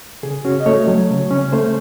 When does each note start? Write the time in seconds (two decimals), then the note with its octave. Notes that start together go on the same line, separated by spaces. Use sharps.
0.23 C#3 G#4
0.45 C#4 F#4
0.60 D#5
0.66 A3 C#5
0.87 F#3
1.10 C#3
1.31 C#4
1.53 A3 C5